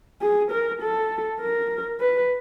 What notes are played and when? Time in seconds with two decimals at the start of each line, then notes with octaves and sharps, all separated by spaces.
0.21 G#4
0.51 A#4
0.81 A4
1.41 A#4
2.00 B4